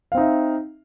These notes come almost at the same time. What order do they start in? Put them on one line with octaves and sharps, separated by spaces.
F5 C4 D#4 E5